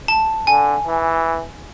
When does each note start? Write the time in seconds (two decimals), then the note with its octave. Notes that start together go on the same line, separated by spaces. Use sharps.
0.08 A5
0.47 D3 G#5
0.87 E3